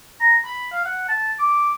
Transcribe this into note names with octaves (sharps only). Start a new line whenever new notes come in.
A#5
B5
F5
F#5
A5
D6